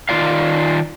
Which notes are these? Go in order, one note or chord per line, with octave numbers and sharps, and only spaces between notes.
D#3 F4 D5 F5